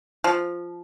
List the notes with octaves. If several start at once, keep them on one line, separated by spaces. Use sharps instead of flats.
F3